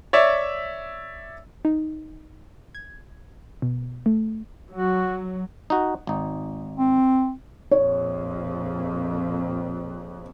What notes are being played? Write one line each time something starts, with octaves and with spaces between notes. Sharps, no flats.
C#5 D5 E5
D#4
G#6
B2
A3
F#3 F#4
D#4 F#4
G#1 D#4
C4
A#1 F2 C#5